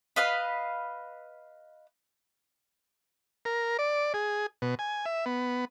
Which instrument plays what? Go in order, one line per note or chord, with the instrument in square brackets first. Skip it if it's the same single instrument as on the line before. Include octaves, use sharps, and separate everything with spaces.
[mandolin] B4 D#5 F5 B5
[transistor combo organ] A#4
D5
G#4
B2
G#5
E5
B3